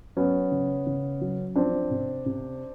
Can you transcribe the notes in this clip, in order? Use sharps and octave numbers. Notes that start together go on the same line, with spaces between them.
F#3 B3 C#4
C#3
C#3
F#3
F3 C4 D4
C3
C3